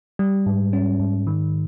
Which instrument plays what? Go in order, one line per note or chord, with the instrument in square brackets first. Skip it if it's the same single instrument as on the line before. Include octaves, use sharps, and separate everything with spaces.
[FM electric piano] G3
G#2
C#4
G#2
D#3